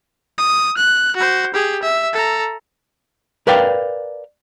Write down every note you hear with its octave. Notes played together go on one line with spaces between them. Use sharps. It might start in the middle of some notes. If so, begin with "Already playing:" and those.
D#6
F#6
F#4 C5
G4 G#4
E5
A4 A#5
A#4 B4 D5 F5 G5